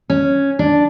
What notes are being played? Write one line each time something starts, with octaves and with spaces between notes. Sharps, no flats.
C#4
D4